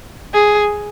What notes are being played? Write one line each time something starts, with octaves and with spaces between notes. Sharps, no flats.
G#4